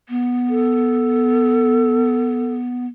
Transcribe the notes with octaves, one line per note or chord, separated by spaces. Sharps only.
B3
A4